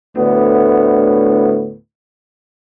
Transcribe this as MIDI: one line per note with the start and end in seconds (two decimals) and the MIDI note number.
0.17 1.75 38
0.17 1.75 45
0.17 1.75 50
0.17 1.75 59